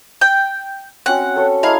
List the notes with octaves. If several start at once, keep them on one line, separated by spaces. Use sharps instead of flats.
G5
C4 C#4 F#4 F#5
A4 C#5
A3 D#4 E4 G#4 F5